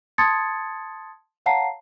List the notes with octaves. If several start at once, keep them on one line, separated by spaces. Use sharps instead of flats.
A5 C6 D#6 G#6 A6 C#7
C#5 F5 F#5 A5 A#5 C7